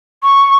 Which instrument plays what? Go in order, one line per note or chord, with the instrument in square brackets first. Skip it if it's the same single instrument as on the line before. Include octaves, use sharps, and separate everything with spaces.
[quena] C#6